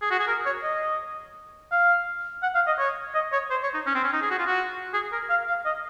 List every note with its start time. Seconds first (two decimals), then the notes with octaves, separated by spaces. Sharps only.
0.02 G#4
0.11 F#4
0.19 G#4
0.28 A#4
0.46 C#5
0.63 D#5
1.72 F5
2.43 F#5
2.55 F5
2.67 D#5
2.78 C#5
3.14 D#5
3.32 C#5
3.50 C5
3.63 C#5
3.74 D#4
3.86 C#4
3.95 C4
4.04 C#4
4.13 D#4
4.22 G#4
4.30 F#4
4.39 F4
4.47 F#4
4.94 G#4
5.12 A#4
5.30 F5
5.48 F5
5.66 D#5